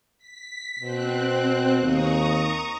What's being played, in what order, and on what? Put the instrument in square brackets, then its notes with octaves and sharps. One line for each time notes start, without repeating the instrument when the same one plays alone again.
[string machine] B6
[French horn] B2 [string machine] C4 F#6
[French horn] D#2 [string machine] A#5 C#6 D#6